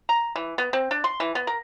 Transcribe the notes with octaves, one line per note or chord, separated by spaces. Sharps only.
A#5
E3
B3
C4
D4
C6
E3
B3
A#4